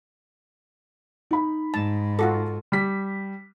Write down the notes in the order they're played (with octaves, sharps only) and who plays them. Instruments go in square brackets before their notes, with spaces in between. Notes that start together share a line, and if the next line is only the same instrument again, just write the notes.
[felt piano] D#4 B5
[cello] G#2 [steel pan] A5
[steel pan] F4 F#4 A4
[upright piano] G3 B6